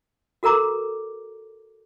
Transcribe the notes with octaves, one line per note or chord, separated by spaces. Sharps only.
F#4 A4 A#4 A#5 D6